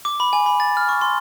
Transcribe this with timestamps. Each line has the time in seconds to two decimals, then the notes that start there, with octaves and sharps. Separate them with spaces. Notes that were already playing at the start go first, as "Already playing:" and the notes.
0.05 D6
0.20 B5
0.33 G#5
0.46 B5
0.60 A6
0.77 F6
0.89 C#6
1.01 C6